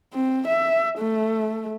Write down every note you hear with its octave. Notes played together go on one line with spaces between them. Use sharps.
C4
E5
A3